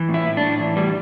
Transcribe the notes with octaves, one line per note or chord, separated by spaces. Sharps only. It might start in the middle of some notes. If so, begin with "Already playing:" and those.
Already playing: E3
A2
E4
A2
D4
A2
E3
E3 G3